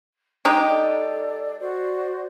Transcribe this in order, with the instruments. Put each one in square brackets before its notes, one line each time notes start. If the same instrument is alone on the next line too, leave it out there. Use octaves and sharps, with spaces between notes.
[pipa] G#3 D#4 G4 [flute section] G5
[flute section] A4 D5
F#4 C5 D5